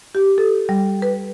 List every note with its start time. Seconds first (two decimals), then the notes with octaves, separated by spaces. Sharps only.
0.15 G4
0.38 A4
0.69 G3
1.02 B4